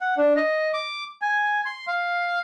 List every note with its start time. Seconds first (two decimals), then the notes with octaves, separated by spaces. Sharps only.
0.01 F#5
0.17 D4
0.36 D#5
0.73 D6
1.22 G#5
1.65 C6
1.87 F5